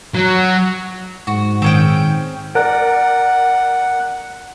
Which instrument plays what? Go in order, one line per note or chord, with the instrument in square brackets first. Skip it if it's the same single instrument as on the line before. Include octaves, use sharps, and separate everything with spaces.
[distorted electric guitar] F#3
[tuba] G#2 [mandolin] F#4
[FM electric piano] A#2 D#3 [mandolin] C4 C#4 G5
[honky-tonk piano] A#4 D5 [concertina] F#5